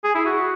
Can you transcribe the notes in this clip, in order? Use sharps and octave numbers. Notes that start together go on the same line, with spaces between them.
G#4
E4
F#4